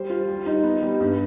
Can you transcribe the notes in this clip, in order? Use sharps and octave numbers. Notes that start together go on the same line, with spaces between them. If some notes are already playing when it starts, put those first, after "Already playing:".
Already playing: G3 C5
F4
G3
D#4
B3
G3
G2